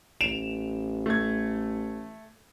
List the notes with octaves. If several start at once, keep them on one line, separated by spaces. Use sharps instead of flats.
A1 D7 E7 F7
A3 G#6